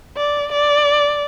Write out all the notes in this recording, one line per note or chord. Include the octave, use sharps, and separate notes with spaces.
D5
D5